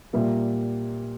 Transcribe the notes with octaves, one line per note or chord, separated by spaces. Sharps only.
A#2 G3 A#3 E5